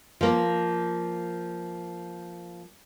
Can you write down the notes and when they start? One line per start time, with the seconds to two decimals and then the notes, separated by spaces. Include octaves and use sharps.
0.21 F3 A#3